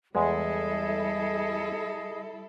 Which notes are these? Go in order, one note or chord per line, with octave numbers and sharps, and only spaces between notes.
E2 G3 G#3 E4 G#4 A4 D#5